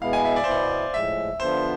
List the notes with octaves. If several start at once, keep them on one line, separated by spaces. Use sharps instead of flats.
B2 G#3 B3 E4 F5
G#5
E5
D5
C5
B2 B3 E4 D5
A2 F3 G#3 E5
D3 F3 B3 D4 F4 C5